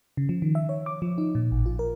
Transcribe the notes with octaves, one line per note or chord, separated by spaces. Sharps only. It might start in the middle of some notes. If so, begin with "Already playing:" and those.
C#3
F3
D#3
E5
C#5
D6
F3
D#4
A#2
A1
F4
A#4